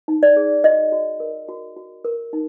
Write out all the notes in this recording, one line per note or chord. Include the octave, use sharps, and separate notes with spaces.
D#4
D5
G#4
F#4 D#5
F#4
A#4
F#4
F#4
A#4
D#4